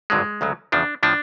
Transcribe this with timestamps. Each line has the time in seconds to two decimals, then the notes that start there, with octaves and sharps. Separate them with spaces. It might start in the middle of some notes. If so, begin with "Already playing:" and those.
0.10 G#1 G2 D3 F#3 G#3
0.41 D2 C#3 F#3
0.72 E2 C#3 F3 D4
1.03 A2 F3 D4